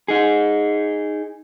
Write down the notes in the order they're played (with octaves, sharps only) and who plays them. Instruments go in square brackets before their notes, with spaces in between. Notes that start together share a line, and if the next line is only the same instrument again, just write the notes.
[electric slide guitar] D#4 G#4